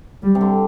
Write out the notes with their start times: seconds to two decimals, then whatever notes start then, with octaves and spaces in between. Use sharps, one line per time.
0.23 G3
0.35 C3
0.41 D3